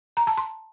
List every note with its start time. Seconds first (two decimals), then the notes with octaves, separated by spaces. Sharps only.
0.17 A#5
0.27 A5
0.37 C6